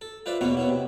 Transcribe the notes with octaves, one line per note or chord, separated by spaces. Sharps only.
A4
F4 B4 C5 D5 E5
E2 B2 A#3 B3 C#4 C#6
B3 C#4 E4
C3